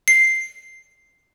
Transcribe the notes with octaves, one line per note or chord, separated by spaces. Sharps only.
C7